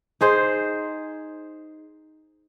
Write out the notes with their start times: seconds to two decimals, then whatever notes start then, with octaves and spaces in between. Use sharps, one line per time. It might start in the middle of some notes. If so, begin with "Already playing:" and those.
0.21 D#4 G#4 C5